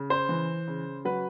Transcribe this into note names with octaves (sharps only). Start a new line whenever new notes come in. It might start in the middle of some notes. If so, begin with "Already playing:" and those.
Already playing: C#3
C5
E3
C#3
F#3 B4